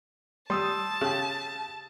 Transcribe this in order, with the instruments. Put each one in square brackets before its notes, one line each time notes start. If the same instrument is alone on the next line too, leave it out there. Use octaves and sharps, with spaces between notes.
[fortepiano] G3 [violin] A5 [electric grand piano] C6 D#6 E6
[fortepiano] C#3 G4